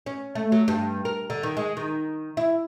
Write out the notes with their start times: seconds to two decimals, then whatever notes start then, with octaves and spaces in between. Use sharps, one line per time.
0.06 C#4
0.35 A3
0.52 F#3
0.68 G2
1.05 A#4
1.30 D3
1.43 D#3
1.57 G#3
1.77 D#3
2.37 E4